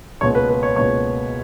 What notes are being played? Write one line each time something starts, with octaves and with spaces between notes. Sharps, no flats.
C#2 B2 A#3 C#5
B4
B4
C#5
C#2 B2 A#3 C#5